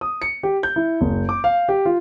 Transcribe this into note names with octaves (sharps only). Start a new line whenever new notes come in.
D#6
C#7
G4
G6
E4
F#1
D6
F5
G4
F4